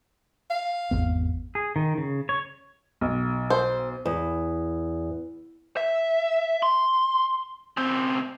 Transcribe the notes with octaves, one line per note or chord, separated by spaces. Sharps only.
F5
G#1 E2 B3
G#4
D#3
C#3
C#5
B1
C5
E2
E5
C6
C#3 C4